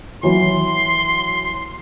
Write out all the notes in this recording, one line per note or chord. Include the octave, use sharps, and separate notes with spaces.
E3 F#3 C6